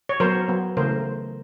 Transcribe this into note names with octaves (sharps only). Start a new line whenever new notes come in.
C#5
F#3 B3 A#4 C5
F#3 B3
C#3 E3 A3 A#4 C5